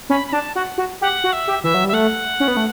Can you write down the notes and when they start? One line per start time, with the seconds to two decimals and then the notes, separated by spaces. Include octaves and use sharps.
0.10 C#4 B5
0.28 B5
0.32 D4 A5
0.55 F#4 F#5
0.78 F#4
1.01 G4 F#5
1.24 F#4
1.33 E5
1.48 G4
1.63 E3 E5
1.74 F#3
1.84 G3 E5
1.93 A3 F#5
2.40 C#4
2.48 B3
2.57 A3